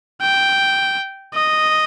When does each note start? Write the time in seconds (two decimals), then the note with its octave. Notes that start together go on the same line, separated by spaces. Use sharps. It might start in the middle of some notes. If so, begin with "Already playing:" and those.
0.22 G5
1.35 D#5